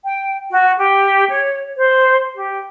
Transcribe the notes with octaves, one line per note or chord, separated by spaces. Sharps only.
G5
F#4
G4
C#5
C5
G4